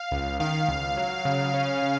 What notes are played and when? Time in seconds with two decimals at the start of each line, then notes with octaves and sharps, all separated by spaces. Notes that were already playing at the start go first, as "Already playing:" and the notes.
Already playing: F5
0.12 C#2
0.40 D#3 F5
0.68 C#2
0.97 F#3
1.25 C#3
1.54 C#4
1.83 C#3